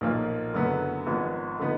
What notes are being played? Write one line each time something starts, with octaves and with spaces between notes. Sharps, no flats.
B1 A#2 F3 A#3 F4
F#1 F#2 D3 F#3 B3
G#1 G#2 F3 B3
D3 F3 B3 D#4